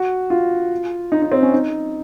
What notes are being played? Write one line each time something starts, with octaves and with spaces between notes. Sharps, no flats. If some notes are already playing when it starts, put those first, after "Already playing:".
Already playing: F#4
F4
D#4
D#4
C4
C#4
D#4